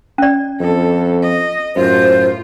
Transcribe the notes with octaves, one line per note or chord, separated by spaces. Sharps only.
C#4 D5
F2 A4
D#5
F#2 A2 F4 C5